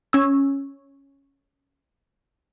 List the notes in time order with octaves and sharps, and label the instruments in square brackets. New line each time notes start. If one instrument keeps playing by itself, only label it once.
[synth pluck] C#4 E6